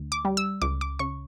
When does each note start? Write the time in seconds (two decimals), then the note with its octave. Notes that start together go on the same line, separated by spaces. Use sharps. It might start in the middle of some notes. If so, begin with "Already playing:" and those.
Already playing: D2
0.12 D6
0.25 G3
0.37 E6
0.62 C#2 D6
0.81 D6
0.99 C#3 C#6